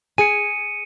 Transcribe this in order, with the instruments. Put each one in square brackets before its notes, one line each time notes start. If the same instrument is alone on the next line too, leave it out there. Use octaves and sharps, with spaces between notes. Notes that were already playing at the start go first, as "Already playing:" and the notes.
[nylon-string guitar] G#4 G#5 [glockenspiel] C#7 D#7